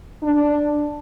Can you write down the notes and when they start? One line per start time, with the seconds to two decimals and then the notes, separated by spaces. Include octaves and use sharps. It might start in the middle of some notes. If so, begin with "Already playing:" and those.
0.23 D4